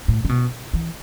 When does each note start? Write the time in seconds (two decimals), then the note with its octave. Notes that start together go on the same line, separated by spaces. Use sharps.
0.08 A2
0.25 C#3
0.29 B2
0.74 E3